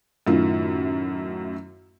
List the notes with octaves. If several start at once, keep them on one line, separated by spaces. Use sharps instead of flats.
F#2 A2 D#3 E4 F4